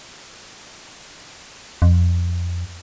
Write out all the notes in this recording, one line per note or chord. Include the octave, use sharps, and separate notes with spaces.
F2